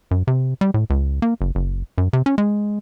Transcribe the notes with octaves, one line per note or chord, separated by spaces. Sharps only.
F#2
C3
G3
A2
C#2
A#3
F#1
F#1
F#2
C3
C#4
G#3